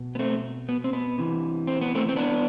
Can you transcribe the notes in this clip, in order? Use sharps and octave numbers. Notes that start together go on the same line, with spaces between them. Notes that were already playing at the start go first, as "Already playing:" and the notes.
Already playing: B2
B3
A3 C4
B3
C4
B3
C3 E3
C4
B3
A3 C4
C4
B3 D4